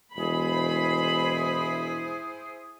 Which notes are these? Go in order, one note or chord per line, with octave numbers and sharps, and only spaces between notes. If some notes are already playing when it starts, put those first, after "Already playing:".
E1 E4 G#4 C5 B5